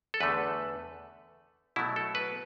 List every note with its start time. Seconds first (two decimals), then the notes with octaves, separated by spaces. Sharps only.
0.14 A4
0.20 E2 D3 A3 B4
1.76 B2 F#3 A3 E4
1.96 A4
2.15 B4